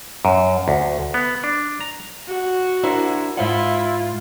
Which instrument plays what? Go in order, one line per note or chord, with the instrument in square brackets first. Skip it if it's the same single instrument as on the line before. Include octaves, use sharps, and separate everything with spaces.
[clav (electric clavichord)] F#2
D2
B3
D4
A#5
[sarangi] F#4
[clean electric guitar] D4 A#4 C5 [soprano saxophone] E4
[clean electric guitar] G#2 C5 F#5 [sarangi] E4 [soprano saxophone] F4